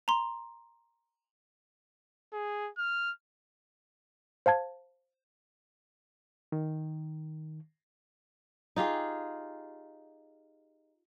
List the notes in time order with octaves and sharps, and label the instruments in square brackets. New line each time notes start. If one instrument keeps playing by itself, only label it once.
[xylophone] A#5 C6
[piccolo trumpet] G#4
F6
[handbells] C5 F5 A5 G#6
[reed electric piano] D#3
[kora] D#4 F4 G4 G#4